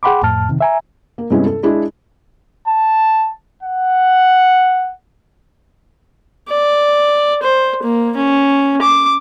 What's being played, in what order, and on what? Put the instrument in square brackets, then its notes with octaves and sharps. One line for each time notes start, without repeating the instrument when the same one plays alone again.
[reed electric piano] G#4 F#5 G5 B5 C6 D6
F2 A2 A5 F6
C3 D#3
E5 G#5 A#5
[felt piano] A#3
G2 C3 G#3 B3 C#4 E4
A4
G#3 D4 E4 G#4
[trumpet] A5
F#5
[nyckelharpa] D5
C5
A#3
C#4
D6